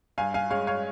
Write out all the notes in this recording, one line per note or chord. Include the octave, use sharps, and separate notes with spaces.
G2 F5 G#5
F5 G#5
G#3 C#5 F5
C#5 F5